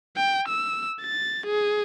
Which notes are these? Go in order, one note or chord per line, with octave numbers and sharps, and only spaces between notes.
G5
E6
A6
G#4